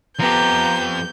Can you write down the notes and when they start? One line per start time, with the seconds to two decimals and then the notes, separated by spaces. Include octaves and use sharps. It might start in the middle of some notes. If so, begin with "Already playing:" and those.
0.19 F2 F3 B3 G4 A#5 G6